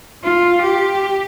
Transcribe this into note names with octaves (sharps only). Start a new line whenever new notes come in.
F4
G4